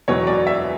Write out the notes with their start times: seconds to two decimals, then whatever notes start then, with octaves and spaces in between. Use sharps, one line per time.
0.08 E1 E2 B2 F#3 C#5
0.27 D5
0.47 E5